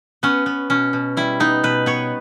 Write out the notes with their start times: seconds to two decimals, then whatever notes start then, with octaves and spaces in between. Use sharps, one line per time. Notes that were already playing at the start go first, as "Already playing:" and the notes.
0.23 B3 C#4
0.46 B3
0.70 B2 C#4
0.93 B2
1.17 G3 E4
1.40 B3 D#4
1.63 B2 B4
1.86 B3 C#5